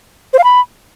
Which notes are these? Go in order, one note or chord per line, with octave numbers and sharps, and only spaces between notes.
C5
F5
B5